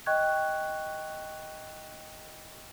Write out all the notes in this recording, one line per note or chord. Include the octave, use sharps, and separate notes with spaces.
D#5 G5 C#6 F#6 G#6